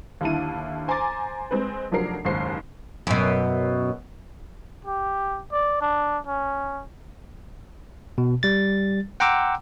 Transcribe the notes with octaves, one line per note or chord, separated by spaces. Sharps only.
D#2 D3 E4 A5 D#7
C5 G#5 A#5 C6 D6 A6
G#3 C4 B4
F1 F3 F#3 D4 A#4 C7
F#1 D#2 G#2 C5 C6 C7
F#2 B2
G4
D5
D4
C#4
B2
G3 A6
F#5 G5 A#5 C6 D6 E6